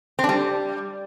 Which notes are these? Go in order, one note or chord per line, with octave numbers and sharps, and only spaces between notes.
C4
D4
G3